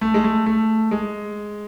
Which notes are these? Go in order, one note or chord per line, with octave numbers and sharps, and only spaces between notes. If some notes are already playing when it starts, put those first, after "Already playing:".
A3
G#3
A3
A3
G#3